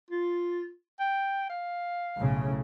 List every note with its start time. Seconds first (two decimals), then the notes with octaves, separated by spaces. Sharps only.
0.11 F4
1.00 G5
1.49 F5
2.17 B1 A2 C#3